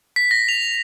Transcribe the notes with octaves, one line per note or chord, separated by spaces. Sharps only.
B6
A#6
F7